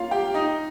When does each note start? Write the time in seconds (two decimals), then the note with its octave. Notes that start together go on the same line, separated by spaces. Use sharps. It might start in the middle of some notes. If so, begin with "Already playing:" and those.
Already playing: A#3 C#4 F4 F5
0.11 G4 G5
0.34 D#4 D#5